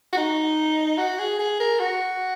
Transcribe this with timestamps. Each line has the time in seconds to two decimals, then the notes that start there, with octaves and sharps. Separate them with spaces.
0.13 F#4
0.17 D#4
0.98 F#4
1.19 G#4
1.39 G#4
1.60 A#4
1.80 F#4